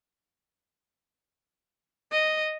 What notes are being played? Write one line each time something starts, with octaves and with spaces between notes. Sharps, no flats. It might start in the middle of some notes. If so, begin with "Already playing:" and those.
D#5